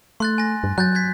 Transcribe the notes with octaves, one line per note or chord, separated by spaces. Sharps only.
A3 C6 F#6 A6
G#5 A#6
G2
F#3 F#6 G6 A6
G6 G#6 B6